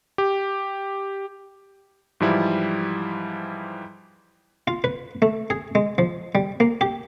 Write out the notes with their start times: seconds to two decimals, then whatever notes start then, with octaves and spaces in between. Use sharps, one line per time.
0.18 G4
2.20 G#2 E3 F3 G3 E4
4.68 F4
4.84 B4
5.22 A3
5.50 G#4
5.75 G#3
5.98 F3
6.35 G3
6.60 A#3
6.81 G4